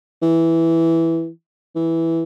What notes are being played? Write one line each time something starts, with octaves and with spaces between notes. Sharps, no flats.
E3
E3